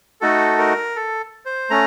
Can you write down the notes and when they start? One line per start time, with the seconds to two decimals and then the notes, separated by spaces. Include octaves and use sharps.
0.21 A3 D#4 F#4 A4
0.58 A#4
0.96 A4
1.46 C5
1.70 A3 C#4 A#5